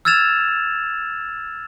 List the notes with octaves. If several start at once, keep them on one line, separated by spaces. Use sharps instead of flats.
E6 F6 G#6 A6 E7 F7